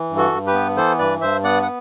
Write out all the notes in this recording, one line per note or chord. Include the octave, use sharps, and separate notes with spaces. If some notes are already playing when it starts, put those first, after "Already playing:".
Already playing: E3
G2
F#4 A4
G2
G4 B4
B3
E3 A4 C5
G2 B4 D5
G2 C5 E5
B3 D5 F#5
F#5